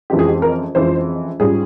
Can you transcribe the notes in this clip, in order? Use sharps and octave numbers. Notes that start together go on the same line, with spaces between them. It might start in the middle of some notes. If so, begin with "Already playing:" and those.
F2 E3 G#3 C#4 F4 G4
G#4
G4
A#4
F2 E3 G#3 C#4 F4 C5
G#2 G3 C#4 F4 G#4